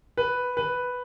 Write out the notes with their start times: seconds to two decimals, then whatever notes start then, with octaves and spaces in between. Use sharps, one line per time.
0.17 B4
0.57 B4